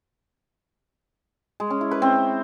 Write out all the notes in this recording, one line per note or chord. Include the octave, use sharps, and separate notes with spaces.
G#3
C#4
E4
B4
C4